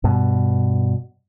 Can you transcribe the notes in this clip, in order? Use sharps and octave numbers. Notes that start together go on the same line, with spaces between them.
G2 B2